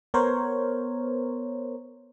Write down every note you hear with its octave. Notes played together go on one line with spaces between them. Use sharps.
B3 A#4 C5 C#5